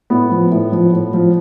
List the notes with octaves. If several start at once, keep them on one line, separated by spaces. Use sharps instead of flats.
A2 B3
F3
A2
F3
A2
F3